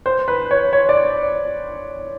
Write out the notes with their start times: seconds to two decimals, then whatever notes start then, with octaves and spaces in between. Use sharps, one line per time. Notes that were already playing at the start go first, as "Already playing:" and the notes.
0.06 C5
0.28 B4
0.51 C#5
0.73 C#5
0.89 D5